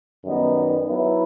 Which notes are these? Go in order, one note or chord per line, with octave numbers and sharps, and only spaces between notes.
F#2 D#3 G3 B3 D#4
F#3 B3 E4